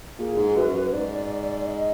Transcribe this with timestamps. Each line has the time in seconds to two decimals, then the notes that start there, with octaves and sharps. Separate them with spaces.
0.19 A#2 G#4
0.37 G#2
0.56 F#2 B4
0.74 F#2
0.93 G#2 D5
1.67 D#5